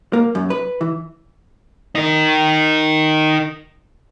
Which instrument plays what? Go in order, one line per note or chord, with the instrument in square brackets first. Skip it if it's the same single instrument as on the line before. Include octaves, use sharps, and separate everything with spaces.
[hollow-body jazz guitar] A#3
F#2
B4
E3
[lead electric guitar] D#4 A#4